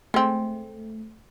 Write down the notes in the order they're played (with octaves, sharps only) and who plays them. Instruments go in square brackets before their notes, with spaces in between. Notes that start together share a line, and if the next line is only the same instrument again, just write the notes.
[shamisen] G#3 C4 [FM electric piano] A3